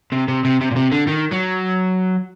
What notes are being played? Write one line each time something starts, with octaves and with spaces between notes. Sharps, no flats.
C3
C3
C3
C3
A#2
C3
D3
D#3
F#3